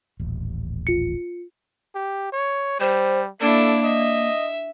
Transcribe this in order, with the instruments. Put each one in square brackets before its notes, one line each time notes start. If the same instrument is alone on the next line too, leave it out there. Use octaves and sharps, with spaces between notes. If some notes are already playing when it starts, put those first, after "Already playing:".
[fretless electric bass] D#1 A1
[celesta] F4 C#7
[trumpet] G4
C#5
[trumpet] G3 [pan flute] C5
[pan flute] A#3 [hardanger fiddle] D4 E4 [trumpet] A4
[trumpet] D#5 [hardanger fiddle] E5